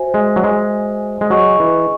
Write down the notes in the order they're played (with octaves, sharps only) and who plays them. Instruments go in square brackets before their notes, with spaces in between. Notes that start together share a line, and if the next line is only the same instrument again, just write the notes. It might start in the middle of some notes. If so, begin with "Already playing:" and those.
Already playing: [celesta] F#4 C5 E5 G#5
[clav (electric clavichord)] G#3
F#3
G#3
G#3
[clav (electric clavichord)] F#3 [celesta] G#4 D#5 G#5 C#6
[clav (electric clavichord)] E3